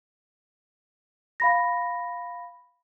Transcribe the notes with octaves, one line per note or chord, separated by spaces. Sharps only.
F5 B5 A#6